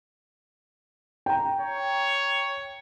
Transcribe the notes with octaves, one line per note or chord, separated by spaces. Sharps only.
G5 A#5
C#5